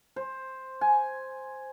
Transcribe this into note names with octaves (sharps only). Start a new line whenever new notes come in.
C5
G#5